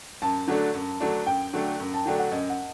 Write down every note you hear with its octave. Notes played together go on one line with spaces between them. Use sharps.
F#2 A5
D3 F#3 A3 D4
F#2
D3 F#3 A3 D4
F#2 G5
D3 F#3 A3 D4
F#2
A5
D3 F#3 A3 D4 G5
F#5
F#2 D#5
F#5